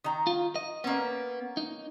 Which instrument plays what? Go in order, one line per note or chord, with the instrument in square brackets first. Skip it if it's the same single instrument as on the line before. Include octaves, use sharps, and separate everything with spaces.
[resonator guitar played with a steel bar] D#3 A#5
[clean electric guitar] F4
D#5
[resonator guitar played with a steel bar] A#3 C#4 [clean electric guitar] B3
[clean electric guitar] D#4